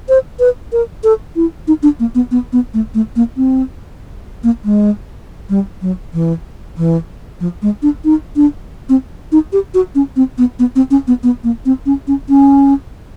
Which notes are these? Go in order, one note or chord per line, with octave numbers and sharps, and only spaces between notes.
C5
B4
A#4
A4
E4
D#4
D4
A#3
B3
B3
B3
A3
A3
A#3
C4
A#3
G#3
G3
F#3
E3
E3
F3
G#3
D4
D#4
D4
C4
D#4
G4
F#4
C#4
C4
B3
B3
C4
C#4
B3
B3
A#3
C4
C#4
C#4
C#4